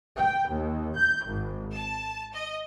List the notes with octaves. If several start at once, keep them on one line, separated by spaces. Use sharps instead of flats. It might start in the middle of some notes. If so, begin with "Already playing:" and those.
G5
D#2
G6
G#1
A5
D#5